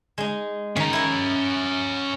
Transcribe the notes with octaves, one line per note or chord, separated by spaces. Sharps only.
G#3 D#4
D#3 C#4 A#5
E4 A#4